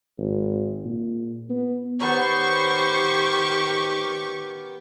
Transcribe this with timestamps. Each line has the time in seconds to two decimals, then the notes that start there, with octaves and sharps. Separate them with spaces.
0.18 G#1
0.85 A#2
1.50 B3
2.00 D#3 B3 G4 A#4 C5 C#5 C#6